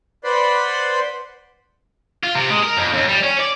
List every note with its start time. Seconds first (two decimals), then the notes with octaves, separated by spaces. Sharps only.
0.24 B4 C5 D5 F#5 B5 C6
2.24 F4
2.35 C3
2.50 G#3
2.63 A#4
2.77 F2
2.94 D#2
3.09 G3
3.23 C#4
3.40 D5